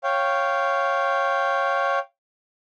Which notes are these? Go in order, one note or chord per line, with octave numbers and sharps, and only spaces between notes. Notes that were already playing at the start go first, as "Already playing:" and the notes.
C#5 F5 G5